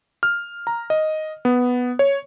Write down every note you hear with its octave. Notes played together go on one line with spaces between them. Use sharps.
F6
A#5
D#5
B3
C#5